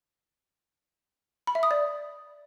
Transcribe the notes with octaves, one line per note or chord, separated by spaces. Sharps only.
B5
E5
D#6
D5